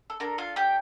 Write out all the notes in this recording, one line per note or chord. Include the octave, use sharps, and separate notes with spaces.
A4
D4 A4 A#4
F4 F5
G4 G5